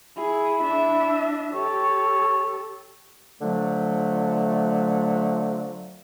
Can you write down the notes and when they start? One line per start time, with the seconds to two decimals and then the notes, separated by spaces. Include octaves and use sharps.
0.18 E4 G#4
0.61 D4 E5
1.54 G4 A4 C#5
3.42 D3 F3 F#3 A3